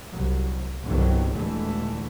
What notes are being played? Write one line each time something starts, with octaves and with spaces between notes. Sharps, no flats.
C2 F#3
G1 C2 B2 D3 D#3 F#3
D#2 A#2 D3 E3 G#3 A3